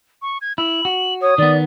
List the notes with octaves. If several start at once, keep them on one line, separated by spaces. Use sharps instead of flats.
C#6
G#6
E4 F#7
F#4
C#5 D#6
D#3 B3 D5